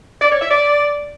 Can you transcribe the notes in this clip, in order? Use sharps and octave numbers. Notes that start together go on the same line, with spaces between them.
D5
C#5
E5
D5